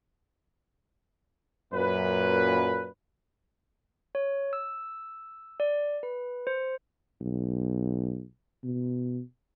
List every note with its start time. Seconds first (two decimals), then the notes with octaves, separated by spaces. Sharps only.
1.72 F#2 A#2 B4
4.15 C#5
4.53 E6
5.60 D5
6.03 B4
6.47 C5
7.21 B1
8.64 B2